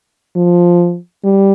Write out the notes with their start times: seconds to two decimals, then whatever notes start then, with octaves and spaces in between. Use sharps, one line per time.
0.36 F3
1.24 G3